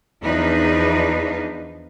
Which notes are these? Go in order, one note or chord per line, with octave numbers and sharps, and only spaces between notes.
E2 F3 D4 D#4 B4